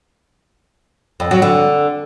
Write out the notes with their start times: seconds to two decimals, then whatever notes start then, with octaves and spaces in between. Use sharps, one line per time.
1.20 F2
1.31 F#3
1.42 D3